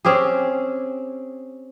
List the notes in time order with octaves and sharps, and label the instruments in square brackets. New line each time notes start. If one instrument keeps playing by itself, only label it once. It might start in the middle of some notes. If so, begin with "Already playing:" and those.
[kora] C4 C#4 G4 G#4